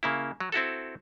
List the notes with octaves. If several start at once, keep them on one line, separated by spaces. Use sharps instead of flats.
C#3 A#3 E4
F#3
C4 E4 F#4 A4